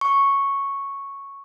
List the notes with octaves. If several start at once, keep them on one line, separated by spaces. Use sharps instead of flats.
C#6